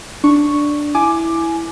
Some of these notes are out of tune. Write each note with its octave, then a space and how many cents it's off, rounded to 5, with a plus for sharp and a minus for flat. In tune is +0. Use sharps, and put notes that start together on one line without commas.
D4 +0 C#6 +0
E4 +0 G#5 +15 D6 +10